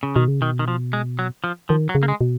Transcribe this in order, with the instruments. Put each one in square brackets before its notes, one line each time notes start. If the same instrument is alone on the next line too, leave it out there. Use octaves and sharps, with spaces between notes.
[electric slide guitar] C#3
[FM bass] B2 [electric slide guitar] D#3
[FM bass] C#3
[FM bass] B2 [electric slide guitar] D#3
[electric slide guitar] D#3
F3
G#3
F#3
F3
[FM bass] D#3 [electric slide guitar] F3
[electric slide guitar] F#3
[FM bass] C#3
[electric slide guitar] A#3
G#3
[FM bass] B2